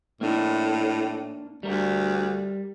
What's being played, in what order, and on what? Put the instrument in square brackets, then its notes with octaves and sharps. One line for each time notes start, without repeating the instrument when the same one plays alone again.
[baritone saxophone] A2 [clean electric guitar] A#3 D4 D#4
[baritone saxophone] D2 [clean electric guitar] G3 A#4